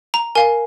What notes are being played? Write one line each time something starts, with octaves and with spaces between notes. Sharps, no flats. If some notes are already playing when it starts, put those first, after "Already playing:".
A#5
A#4 F5 G#5